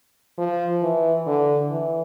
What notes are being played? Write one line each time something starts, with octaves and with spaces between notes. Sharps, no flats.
F3
E3
D3
E3